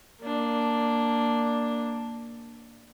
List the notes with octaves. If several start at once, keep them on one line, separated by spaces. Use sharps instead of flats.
A#3 D4